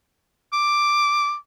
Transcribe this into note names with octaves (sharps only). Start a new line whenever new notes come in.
D6